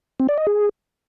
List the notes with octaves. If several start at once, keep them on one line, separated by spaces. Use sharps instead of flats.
C4
D5
D#5
G#4